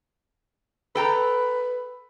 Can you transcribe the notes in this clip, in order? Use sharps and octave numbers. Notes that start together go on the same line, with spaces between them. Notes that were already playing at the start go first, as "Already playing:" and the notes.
A4 B4 G5 A#5